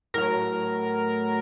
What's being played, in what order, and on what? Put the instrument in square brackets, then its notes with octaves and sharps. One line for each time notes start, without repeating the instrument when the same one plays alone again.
[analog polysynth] A2 F#3 A#4